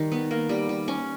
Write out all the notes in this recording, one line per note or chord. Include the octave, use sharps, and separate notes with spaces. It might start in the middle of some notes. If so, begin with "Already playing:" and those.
Already playing: D#3 G3
B3
A#3
G3
G3
C#4